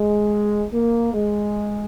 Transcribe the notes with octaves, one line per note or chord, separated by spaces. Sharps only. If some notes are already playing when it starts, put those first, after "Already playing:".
Already playing: G#3
A#3
G#3